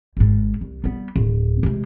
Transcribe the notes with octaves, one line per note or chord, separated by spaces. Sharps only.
G#1 G#2
C2
G3 B3
D1
C3 G#3